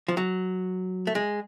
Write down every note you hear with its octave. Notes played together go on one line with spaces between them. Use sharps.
F3
F#3
A3
G#3